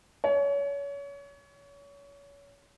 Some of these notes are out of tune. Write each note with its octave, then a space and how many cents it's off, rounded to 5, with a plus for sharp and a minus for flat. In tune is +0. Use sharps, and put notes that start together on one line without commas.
C#5 +30